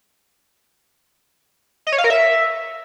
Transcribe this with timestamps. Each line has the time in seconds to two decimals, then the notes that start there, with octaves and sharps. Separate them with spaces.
1.87 D#5
1.92 C#5
1.98 F5
2.04 A#4
2.10 E5